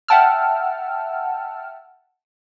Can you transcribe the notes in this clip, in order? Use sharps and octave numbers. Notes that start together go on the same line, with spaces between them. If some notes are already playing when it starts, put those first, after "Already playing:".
E5 F#5 G5 A5 E6 F6